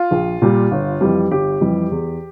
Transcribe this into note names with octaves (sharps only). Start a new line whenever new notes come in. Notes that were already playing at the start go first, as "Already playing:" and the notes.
Already playing: F4
A#1
A#2 G3
G1
F2 E3 G3
G1 G4
F2 E3 G3
E2